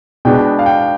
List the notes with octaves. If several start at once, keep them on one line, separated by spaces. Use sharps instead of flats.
B2 G#3 B3 D4 G5
F5
G5